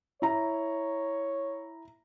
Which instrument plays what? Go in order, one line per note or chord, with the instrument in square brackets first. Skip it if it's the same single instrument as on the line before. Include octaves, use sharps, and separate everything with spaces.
[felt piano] E4 A#5 [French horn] C#5